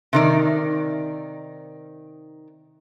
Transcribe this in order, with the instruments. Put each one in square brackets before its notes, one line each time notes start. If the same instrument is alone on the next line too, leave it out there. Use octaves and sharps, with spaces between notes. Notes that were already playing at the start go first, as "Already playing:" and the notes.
[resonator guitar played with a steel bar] C3 D#3 D5